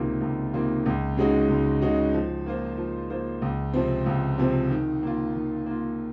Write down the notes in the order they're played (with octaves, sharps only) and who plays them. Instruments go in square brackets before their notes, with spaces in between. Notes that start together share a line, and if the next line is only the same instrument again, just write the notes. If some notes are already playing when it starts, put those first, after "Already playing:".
Already playing: [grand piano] C#2 C3 D#3 A#3 F4
C#2
C3 D#3 A#3 F4
C#2
C#3 G#3 D#4 F#4
C#2
C#3 G#3 D#4 F#4
F3
A#3 F4 C5
F3
A#3 F4 C5
C#2
C3 F3 C4
C#2
C3 F3 C4
D#3
A#3 F4
D#3
A#3 F4